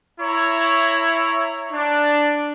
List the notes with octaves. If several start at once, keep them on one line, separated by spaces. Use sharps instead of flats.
E4 C#5 E5 A#5
D4